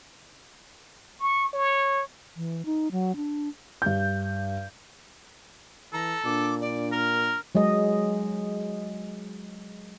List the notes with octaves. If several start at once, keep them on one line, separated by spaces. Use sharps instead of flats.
C#6
C#5
E3
D#4
F#3
D4
G2 G6
E3 A4 A#5
A#2 D4 D6
D5
A#4 F6
F#3 G#3 G#4 D#5